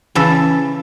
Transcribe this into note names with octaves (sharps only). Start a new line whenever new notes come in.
C#3 E3 A4